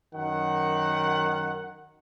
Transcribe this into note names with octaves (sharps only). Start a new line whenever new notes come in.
F#2 D#3 F#5